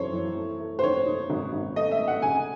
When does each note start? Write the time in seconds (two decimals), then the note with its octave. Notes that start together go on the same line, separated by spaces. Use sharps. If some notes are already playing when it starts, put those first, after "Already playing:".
Already playing: F#2 E3 C4 A4 C5 C#5
0.13 E3
0.36 A3
0.59 A3
0.79 C5
0.83 D#3 C#5
1.06 D#4
1.30 G#1
1.53 G#1
1.76 A3 D#5
1.91 E5
1.99 A3
2.08 F#5
2.22 C#3 G#5